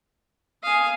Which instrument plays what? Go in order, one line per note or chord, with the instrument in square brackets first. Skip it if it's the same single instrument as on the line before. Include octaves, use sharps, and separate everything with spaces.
[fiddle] F5 [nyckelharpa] G#5 D#6